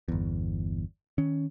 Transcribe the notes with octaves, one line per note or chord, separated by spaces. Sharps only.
G1 E2
D#3 C#4